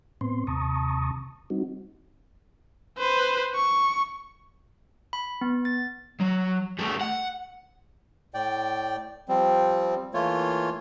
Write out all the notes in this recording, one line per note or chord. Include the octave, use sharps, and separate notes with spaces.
A2 B3 C4 C6
D#2 C3 A5 A#5 C#6 D#6
G3 C4 D#4 F#4
B4 C5
C#6
B5
B3
A6
F#3
G3 A3
F#5
A2 D5 G5
F3 G3 C4
E3 A3 A#3 F4 C#5